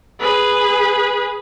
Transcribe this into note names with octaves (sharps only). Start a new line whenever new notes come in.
G#4 B4